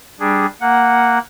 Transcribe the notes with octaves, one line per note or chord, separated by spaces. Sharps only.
G3 D4 G#4
A#3 F#5